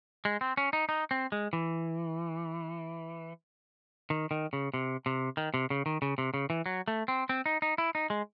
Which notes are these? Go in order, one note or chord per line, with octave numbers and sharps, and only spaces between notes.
G#3
C4
C#4
D#4
D#4
C4
G#3
E3
D#3
D#3
C#3
C3
C3
D#3
C3
C#3
D#3
C#3
C3
C#3
E3
F#3
A3
C4
C4
D#4
D#4
E4
D#4
G#3